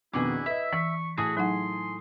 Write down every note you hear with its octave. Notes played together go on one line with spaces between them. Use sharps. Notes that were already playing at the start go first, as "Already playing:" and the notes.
F2 B2 D#3 D4 E4 F#4 G#4
B4 D#5 E5
E3 C#6 B6
A2 F#4 G#4 A5 D#6
F#3 D#4 F#5 C6